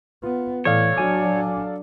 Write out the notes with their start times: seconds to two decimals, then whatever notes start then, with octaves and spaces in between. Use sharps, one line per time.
0.23 B3 F4
0.65 A2 E3 A4 C#5 D5 F5
0.96 F#3 D4 F#4 G#5 D6